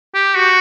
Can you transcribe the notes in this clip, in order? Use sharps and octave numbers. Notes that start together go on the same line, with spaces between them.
G4
F#4